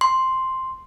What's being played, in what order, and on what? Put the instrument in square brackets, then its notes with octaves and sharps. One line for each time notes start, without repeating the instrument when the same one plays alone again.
[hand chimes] C6